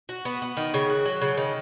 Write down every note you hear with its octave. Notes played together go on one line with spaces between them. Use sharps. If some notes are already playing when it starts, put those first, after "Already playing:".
F#4
B3
B3
D#3
C#3
F#4
F#3
C#3
D#3